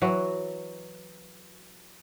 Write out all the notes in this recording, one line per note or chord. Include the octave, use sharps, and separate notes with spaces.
E3 F#3 F#4